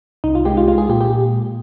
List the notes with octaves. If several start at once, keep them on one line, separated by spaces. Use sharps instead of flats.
C2 D#4
F4
G#3 G4
F4
G#3 F4
G#4
A#2 G4
G4